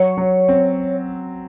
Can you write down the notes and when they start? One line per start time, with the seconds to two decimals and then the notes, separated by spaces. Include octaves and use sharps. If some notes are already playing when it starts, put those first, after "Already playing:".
Already playing: F#3 C#5
0.18 F#3
0.49 C4